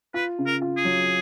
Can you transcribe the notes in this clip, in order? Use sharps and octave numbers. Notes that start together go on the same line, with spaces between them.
F4 B4
C#3
A#4
F4
G#4
F#3